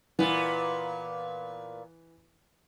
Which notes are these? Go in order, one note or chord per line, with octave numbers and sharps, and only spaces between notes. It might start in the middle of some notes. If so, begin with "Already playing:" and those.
A#2 E3 B3